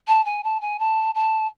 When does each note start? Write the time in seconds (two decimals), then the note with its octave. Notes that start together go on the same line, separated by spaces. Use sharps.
0.08 A5
0.25 G#5
0.44 A5
0.61 G#5
0.79 A5
1.15 A5